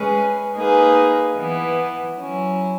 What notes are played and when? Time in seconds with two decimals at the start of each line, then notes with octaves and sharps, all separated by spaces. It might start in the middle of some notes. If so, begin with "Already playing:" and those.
Already playing: G#3 C#4 G#4 B4
0.56 A#3 D#4 G#4 B4
1.36 E3 B3 E4
2.17 F#3 C#4 E4